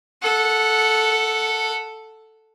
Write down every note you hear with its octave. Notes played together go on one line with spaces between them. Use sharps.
A4 F#5